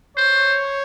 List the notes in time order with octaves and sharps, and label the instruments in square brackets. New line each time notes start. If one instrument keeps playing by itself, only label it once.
[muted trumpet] C5 [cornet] C#5